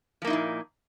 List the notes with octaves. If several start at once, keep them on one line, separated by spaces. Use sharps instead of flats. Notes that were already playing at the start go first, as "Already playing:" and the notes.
A#2 F3 A#3 D#4 E4